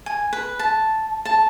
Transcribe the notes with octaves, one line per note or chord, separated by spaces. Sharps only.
G#5
B4
A5
A5